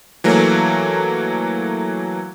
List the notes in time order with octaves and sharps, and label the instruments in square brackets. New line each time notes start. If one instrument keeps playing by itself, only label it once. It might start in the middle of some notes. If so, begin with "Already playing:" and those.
[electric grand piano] E3 F#3 A3 A#3